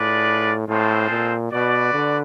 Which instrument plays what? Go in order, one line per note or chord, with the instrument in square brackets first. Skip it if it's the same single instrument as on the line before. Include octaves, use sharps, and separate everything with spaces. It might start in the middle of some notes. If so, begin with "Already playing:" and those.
Already playing: [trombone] A2 [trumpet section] D4 F4 G#4 B4 D5
[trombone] A2 [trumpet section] G#3 C4 F4 A4 C5
[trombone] A#2
[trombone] B2 [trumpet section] F#4 B4 D5
[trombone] D3